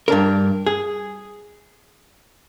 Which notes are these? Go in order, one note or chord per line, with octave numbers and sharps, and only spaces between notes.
G2 D4 A#4
G#4